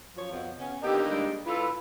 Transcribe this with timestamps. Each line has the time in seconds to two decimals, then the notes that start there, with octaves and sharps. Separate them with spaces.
0.16 F#2 F3 C#5
0.31 F2 B2 F3
0.58 C#3 B3 C#4
0.82 D3 A#3 B3 D#4 G4
1.11 G3 G#3 D4
1.47 E4 F4 A4 B4